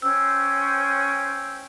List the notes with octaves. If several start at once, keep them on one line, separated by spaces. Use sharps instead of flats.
C#4 C5 G5 E6